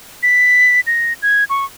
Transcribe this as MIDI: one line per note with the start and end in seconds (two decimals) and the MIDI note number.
0.23 0.81 95
0.87 1.13 94
1.22 1.44 92
1.50 1.65 85